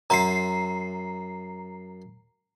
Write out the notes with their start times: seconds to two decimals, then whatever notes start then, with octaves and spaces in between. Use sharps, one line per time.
0.10 F#2 E5 A#5 C6 C7